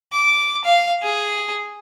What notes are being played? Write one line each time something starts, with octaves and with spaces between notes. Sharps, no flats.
D6
F5
G#4